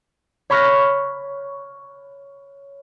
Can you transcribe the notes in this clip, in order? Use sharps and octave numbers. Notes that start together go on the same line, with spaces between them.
C#5 B5 C#6 F6 F#6 A#6